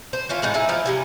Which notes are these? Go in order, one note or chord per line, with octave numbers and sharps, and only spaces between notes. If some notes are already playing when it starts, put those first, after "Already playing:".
C5
E3 C#4 F4
A2 G#3 D#4 A5
D#4 E4 G#4
F3 E4 F4
C3 G3 G#5